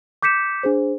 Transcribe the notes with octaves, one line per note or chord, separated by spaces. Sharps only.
D6 G6 B6 C#7 E7
D4 G#4 C5